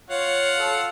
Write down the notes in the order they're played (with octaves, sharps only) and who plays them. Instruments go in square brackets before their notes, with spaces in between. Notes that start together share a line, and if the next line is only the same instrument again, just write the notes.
[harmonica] F4 F5 F#5 [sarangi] C#5
[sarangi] A4